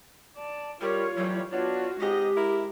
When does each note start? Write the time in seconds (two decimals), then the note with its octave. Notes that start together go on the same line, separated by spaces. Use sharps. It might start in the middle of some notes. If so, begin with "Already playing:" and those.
0.36 D5 A5
0.81 G3 F4 A#4 C#5
1.16 A2 E3 F#3 G3
1.51 B3 D4 F4 F#4 C#5
2.00 G#2 G#3 C4 G4 D#5
2.35 E4 A#4